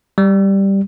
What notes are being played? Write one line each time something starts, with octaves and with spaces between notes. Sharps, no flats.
G3